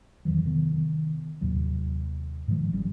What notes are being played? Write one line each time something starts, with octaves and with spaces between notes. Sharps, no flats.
E2 D#3 E3 F#3
C3 D#3 B3
D#2 A2 C3 F#3
G#2 D#3 F3 G#3
G#1 G3 C#4